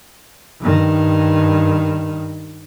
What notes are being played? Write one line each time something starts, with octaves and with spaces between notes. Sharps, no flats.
G2 D#3